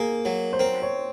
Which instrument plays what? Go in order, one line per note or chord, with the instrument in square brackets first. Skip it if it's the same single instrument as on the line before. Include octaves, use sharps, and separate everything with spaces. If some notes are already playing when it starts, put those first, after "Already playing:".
Already playing: [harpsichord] A#3 [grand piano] G#4
[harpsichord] F#3
[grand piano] C5
[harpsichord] C4 [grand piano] A#4
[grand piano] C#5